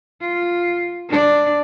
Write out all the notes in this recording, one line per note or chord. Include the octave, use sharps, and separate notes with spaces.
F4
D4 D5